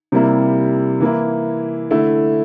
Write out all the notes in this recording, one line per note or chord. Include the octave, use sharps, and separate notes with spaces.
C3 G3 A#3 E4
E3 A#3 E4
D3 A3 E4